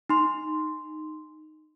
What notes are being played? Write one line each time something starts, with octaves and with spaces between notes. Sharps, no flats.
D#4 C6